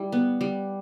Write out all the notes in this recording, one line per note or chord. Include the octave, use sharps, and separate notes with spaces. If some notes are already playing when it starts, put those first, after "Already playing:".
Already playing: G3 E4
B3
G3